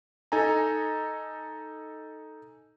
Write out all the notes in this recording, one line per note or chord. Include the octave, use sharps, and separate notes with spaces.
D#4 A4 G#5 A#5